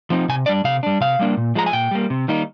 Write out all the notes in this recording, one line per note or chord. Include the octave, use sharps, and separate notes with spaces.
F3 C4 D#4
C3 G#5
G3 D4 D5
C3 F5
G3 D4
C3 F5
G3 A#3 D4
A#2
F3 G#3 A#5
G#5
A#2 G5
G3 A#3
C3
D#3 G3 A#3 D#4